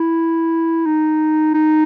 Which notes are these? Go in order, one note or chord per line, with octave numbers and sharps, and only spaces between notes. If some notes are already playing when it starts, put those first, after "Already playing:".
Already playing: E4
D#4
D#4